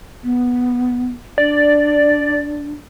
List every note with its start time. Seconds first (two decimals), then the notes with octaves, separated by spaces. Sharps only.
0.24 B3
1.38 D4 D5